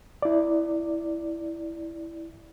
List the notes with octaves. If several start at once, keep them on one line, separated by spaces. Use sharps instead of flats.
E4 D5